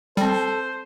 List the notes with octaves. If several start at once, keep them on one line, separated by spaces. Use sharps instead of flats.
G3 C4 A4 C5 G5